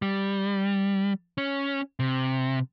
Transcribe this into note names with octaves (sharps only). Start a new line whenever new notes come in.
G3
C#4
C3